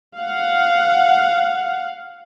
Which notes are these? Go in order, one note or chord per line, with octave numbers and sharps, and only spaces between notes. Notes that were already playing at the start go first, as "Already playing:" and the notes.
F5 F#5